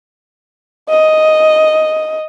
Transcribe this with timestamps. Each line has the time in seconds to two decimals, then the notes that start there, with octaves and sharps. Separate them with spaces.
0.89 D#5